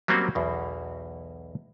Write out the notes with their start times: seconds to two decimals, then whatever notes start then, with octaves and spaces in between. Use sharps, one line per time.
0.08 F#3 G3 A#3 C4 C#4 F#4
0.35 B1 E2 B2